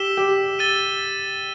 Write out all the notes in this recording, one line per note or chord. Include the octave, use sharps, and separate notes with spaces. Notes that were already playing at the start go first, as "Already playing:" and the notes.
Already playing: G4 E6 B6 E7 G7
G4
E6 A6 D#7 G7